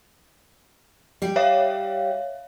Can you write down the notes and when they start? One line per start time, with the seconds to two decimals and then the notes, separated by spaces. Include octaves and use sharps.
1.22 G3 G4
1.36 C#5 E5 F5